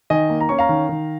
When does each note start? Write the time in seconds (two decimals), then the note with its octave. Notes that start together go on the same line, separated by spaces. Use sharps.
0.10 D#3 D#5 G#5
0.30 A#3
0.40 A#5
0.49 C#4 C#6
0.59 F5 A#5
0.69 D#3
0.89 D#3